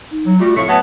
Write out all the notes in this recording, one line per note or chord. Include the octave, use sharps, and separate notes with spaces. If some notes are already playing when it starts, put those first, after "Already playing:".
D#4
F#3
G3 A3 F4 F#4
F2 A2 C3 E5 C#6
A2 F#3 B3 F#5 G#5 A5